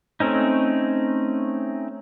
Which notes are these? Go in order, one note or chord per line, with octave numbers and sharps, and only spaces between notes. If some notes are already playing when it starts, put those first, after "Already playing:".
A3 C4 C#4 D#4